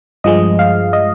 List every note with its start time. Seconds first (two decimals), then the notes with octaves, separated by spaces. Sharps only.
0.24 G2 F3 G#3 D#5
0.59 F5
0.93 D#5